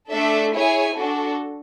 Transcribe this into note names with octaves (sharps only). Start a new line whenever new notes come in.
A3 D4 A4 E5
E4 G#4 C#5 G#5
D4 F#4 A4